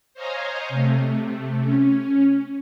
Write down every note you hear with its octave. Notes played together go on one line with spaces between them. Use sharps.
C5 C#5 D#5 F5 G#5 A#5
C3 A3
C#4